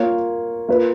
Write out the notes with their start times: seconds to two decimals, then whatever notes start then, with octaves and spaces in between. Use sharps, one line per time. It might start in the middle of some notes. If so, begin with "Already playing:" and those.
Already playing: A#3 F4 A#4 C#5
0.69 A#3 F4 B4